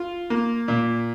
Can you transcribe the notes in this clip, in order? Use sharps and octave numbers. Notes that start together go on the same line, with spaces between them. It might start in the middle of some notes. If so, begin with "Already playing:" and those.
Already playing: F4
A#3
A#2